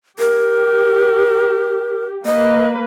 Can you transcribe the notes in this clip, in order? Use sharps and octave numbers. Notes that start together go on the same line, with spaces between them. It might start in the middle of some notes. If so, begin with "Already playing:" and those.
G4 A#4
A#3 B4 D#5